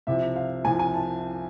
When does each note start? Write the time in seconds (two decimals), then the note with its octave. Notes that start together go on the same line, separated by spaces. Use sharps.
0.07 C2 C3 F3 E5
0.36 F5
0.65 C2 C3 F3 G#5
0.79 G#5
0.94 A5